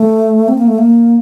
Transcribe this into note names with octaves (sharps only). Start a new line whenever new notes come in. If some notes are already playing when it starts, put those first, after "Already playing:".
Already playing: A3
C4
A#3
A3
A#3